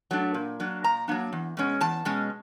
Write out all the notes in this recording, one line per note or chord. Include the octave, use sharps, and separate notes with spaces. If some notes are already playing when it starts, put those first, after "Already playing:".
F#3 A3 D4
A#2
F#3 A#3 D4
A#2 A#5
F#3 A#3 D4
E2
B2 G#3 C#4
E2 A5
B2 G#3 C#4